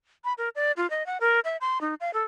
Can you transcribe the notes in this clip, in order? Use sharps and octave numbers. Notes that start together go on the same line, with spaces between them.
B5
A#4
D5
F4
D#5
F#5
A#4
E5
C6
D#4
F5
A4